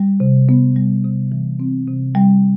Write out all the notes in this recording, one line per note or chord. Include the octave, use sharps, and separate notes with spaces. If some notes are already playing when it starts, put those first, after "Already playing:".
Already playing: G3
C3
B3
G3
C3
E3
C4
C3
G3